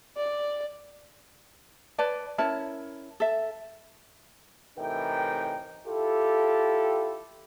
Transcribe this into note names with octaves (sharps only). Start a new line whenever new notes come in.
D5
B4 C#5 D5 A5
C#4 E4 A#4 A5
A4 E5
A2 C3 E3 D#4 A#4 G5
E4 F4 G4 A4